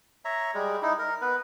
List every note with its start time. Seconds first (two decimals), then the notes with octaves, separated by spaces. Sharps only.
0.25 C#5 E5 A#5
0.54 G3 G#3
0.82 D#4 E4
0.99 A#4
1.21 B3 B4